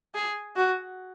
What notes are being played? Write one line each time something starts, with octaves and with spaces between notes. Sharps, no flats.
G#4
F#4